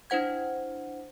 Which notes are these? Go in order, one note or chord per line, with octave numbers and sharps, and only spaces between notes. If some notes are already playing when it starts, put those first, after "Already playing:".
D4 E4 C5 F#5 G#6